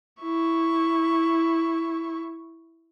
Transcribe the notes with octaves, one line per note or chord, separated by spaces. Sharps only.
E4 C#6